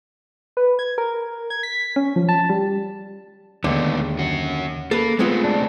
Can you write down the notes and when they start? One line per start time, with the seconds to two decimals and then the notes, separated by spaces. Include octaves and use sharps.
0.57 B4
0.79 G#6
0.98 A#4
1.50 G#6
1.63 B6
1.96 C#4
2.16 F3
2.29 A5
2.50 G3
3.64 D#2 D3 G#3 A3 B3
4.19 C#4 F#4
4.91 A#3 A4 B4
5.19 G#3 A3 B3 C4 F4
5.44 D4